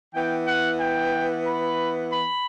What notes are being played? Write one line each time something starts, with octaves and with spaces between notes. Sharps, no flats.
E3 B3 G5
F#5
G5
B5
B5